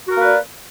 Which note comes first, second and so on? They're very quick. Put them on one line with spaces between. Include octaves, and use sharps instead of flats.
F#4 A#4 A#3 B4 D5